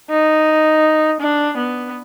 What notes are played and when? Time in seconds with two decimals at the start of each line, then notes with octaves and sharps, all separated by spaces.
0.10 D#4
1.20 D4
1.57 B3